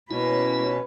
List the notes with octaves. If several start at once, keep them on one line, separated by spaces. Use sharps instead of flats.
B2 A#3 C#4 E4 B4